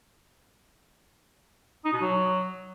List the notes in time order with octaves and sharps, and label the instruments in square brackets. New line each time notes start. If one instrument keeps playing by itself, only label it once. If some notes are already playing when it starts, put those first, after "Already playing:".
[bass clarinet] D#4
B2
F#3